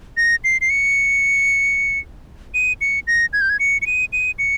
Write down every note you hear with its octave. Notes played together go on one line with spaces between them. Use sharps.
A#6
C7
C7
C#7
D#7
C#7
A#6
G#6
G6
G#6
C#7
C#7
D#7
D#7
C#7